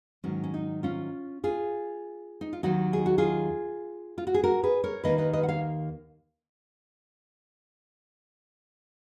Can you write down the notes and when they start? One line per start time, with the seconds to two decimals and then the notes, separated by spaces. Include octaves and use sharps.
0.24 G#2 D#3 F#3 C#4
0.44 C#4
0.54 D#4
0.83 C#4 F4
1.44 F4 G#4
2.41 D#4
2.53 F4
2.63 D#2 D#3 F#3 D#4 F#4
2.93 G#4
3.06 F#4
3.18 F4 G#4
4.18 F4
4.27 F#4
4.34 G#4
4.43 F#4 A#4
4.63 G#4 B4
4.84 A#4 C#5
5.04 D#2 D#3 A#3 B4 D#5
5.18 B4 D#5
5.33 B4 D#5
5.43 F#5
5.49 C#5 F5